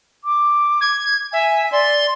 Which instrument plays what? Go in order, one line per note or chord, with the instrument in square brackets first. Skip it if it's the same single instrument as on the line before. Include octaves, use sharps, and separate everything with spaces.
[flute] D6
[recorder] G#6
[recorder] E5 [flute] G#5
[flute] D5 [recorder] C6